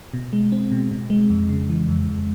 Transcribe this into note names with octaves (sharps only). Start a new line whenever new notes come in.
B2
G#3
C4
B2
B2
G#3
F2
C#3
E3
F2
F2